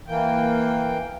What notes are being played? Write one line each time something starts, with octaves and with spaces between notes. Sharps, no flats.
E3 A#3 G5